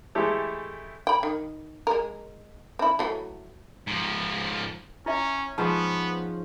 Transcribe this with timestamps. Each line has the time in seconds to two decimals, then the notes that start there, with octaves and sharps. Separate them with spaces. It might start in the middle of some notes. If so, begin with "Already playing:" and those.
0.15 E3 G#3 A3 E4 G4 A4
1.07 G5 B5
1.23 D#3
1.87 G#3 A#4
2.79 C4 E4
2.99 E3 F#3 A3
3.87 G#2 F3
5.06 C#4 E4 E5 G5
5.58 G#2 F3 B3 C#4 C5 A5